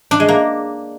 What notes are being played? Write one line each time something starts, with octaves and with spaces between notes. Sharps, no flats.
D4
G#3
A#3